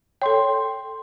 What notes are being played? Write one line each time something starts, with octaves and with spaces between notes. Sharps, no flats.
A4 C#5 G5 C6